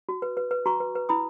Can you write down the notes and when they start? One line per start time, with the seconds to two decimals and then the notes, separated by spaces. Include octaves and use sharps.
0.09 F#4
0.22 B4
0.37 B4
0.51 B4
0.66 F#4 A#5 C#6
0.80 B4
0.95 B4
1.09 E4 B5 D#6